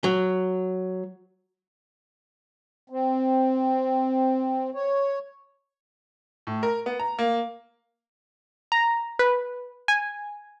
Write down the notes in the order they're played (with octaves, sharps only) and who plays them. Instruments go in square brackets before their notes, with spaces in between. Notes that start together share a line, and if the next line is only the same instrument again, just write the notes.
[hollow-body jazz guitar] F#3
[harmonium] C4
C#5
[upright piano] A2
A#4
B3
A#5
A#3
[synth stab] A#5
B4
G#5